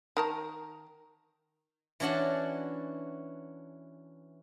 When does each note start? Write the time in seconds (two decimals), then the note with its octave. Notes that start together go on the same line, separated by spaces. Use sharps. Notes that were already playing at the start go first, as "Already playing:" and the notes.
0.17 D#3 A#4 A5
2.00 E3 C#4 D4 F#4 F#5 A5